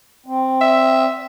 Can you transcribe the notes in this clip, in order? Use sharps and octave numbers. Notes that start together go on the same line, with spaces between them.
C4
E5